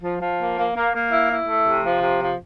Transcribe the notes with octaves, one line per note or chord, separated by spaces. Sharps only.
F3
F3
A#3
A#3
A#3
A#3
E4
E4
A3
C3
F3
C3
F3